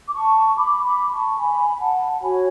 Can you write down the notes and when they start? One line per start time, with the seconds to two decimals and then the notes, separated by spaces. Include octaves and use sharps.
0.08 D6
0.15 A5 C#6
0.57 B5 D6
0.83 B5 D6
1.11 A5 C#6
1.39 G#5 B5
1.81 F#5 A5
2.21 F#4 C#5 G#5 B5